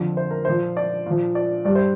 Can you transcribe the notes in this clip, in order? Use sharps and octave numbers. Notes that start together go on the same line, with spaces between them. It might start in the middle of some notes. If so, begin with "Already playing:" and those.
Already playing: F2 D3 F3
C5
A#4
A#2 F3 C5
D5
A#2 F3
D5
G2 G3 D5
C5